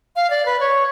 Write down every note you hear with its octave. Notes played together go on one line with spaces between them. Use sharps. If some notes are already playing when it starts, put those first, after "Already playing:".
F5
D5
B4
C#5